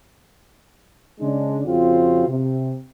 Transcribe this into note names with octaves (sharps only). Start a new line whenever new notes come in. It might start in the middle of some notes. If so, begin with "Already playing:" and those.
C#3 G#3 D4
F2 C#3 C4 F4 F#4
C3